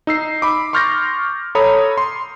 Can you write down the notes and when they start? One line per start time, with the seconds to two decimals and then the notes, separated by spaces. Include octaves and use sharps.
0.07 D#4 E6 C7
0.42 B5 D6
0.73 C6 C#6 F6 G6 A6 A#6
1.55 A4 C#5 A#5 B5 D#6
1.98 C6